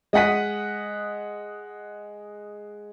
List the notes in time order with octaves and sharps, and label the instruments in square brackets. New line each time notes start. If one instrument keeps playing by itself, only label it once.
[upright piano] G#3 D#5 F#5 B6 D#7